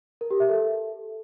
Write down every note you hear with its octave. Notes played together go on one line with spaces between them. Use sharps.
A#4
G4
E5
A4